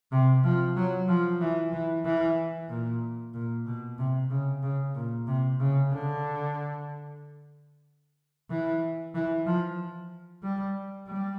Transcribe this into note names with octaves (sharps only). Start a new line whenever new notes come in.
C3
F3
F#3
F3
E3
E3
E3
A#2
A#2
B2
C3
C#3
C#3
A#2
C3
C#3
D3
E3
E3
F3
G3
G3